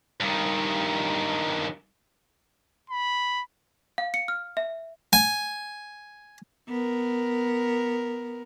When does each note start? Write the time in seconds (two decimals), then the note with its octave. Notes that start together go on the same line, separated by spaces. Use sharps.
0.20 G2 D#3
2.90 B5
3.98 F5
4.14 C#7
4.28 F6
4.57 E5
5.13 G#5
6.68 B3 A#4